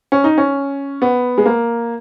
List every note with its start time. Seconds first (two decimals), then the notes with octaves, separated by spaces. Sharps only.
0.12 C#4
0.24 D#4
0.38 C#4
1.02 B3
1.38 G#3
1.46 A#3